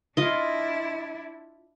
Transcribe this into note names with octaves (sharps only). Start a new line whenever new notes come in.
D4 E4 F4 D#5